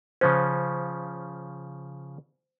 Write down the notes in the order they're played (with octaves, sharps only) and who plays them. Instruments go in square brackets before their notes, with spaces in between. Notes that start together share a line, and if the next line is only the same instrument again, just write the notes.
[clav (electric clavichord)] C#3 F3 C#4 [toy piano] C5